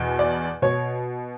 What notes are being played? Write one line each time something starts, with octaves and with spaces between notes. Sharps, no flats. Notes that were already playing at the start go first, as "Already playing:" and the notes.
Already playing: E2 B2
D5
B2 C#5